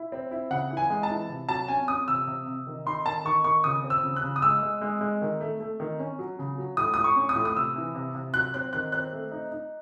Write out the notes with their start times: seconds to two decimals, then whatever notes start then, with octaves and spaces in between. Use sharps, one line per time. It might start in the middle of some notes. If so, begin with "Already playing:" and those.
Already playing: E4
0.12 C4
0.31 E4
0.50 C#3 F#5
0.71 E3
0.77 G#5
0.90 G#3
1.03 A5
1.09 E3
1.29 C3
1.49 F#3 A5
1.68 C#4 G#5
1.88 C#4 D#6
2.08 C3 E6
2.27 C3
2.46 C3
2.67 D#3
2.86 D#4 C6
3.05 D#3 A5
3.25 D#3 C#6
3.44 D#3 C#6
3.64 C#3 D#6
3.84 C4
3.90 E6
4.03 C#3
4.16 F#6
4.23 C#3
4.36 D#6
4.42 G#3 E6
4.63 G#3
4.82 G#3
5.01 G#3
5.22 D#3
5.41 A3
5.60 A3
5.80 D#3
6.00 C#4
6.19 F#3
6.39 C#3
6.58 F#3
6.77 A2 D#6
6.94 A2 D#6
7.04 C#6
7.16 C#4
7.29 D#6
7.36 A2
7.45 D#6
7.56 C3 E6
7.76 E3
7.95 C3
8.15 C3
8.34 F#3 F#6
8.54 C4 F#6
8.73 D#3 F#6
8.92 C4 F#6
9.13 A3
9.32 D#4
9.52 D#4